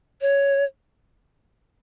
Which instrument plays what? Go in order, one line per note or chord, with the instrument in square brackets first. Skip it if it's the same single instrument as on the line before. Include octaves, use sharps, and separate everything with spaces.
[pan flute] C#5